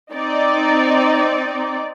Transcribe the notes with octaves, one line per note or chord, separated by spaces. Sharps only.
C4 D#4 D5